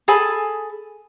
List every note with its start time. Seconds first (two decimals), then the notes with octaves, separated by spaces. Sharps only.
0.08 G#4 A4 G#5 B5